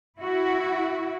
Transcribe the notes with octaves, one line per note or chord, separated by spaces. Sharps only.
E4 F#4